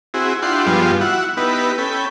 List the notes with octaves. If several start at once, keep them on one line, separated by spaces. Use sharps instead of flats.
C4 E4 F#4 G#4
D4 E4 F4 G4 F#5 C6
G2 F3 G3 G#3 B3 F4
E4 F#4 F#5
B3 D#4 E4 G4 B4
C#4 A4 G5 B5